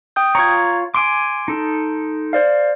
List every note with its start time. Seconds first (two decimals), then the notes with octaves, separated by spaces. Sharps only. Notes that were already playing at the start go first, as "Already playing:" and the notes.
0.16 G5 D#6 G6
0.35 F4 C#5 A#5 G#6
0.94 G#5 C6 D6 D7
1.48 D#4 A4
2.33 C5 D5 F5